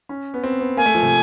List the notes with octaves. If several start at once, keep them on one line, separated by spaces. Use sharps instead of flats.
C#4
B3
C4
B3
A#3 G#5
A3
F3
C3